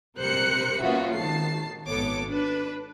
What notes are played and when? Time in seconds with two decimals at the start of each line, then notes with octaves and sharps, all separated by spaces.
0.18 C3 G3 A#4 C5 F#6 C#7
0.80 A#3 B3 C#4 F4 F#4 E5
1.15 G#1 D#3 A5 C7
1.87 G#1 B3 A4 C#5 D6
2.28 D4 B4